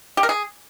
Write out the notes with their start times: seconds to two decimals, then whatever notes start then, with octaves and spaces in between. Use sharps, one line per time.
0.17 G4
0.23 A#4
0.29 G#4